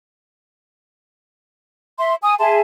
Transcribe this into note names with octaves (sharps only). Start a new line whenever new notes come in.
E5 C6
G#5 D#6
G#4 E5 A5 C6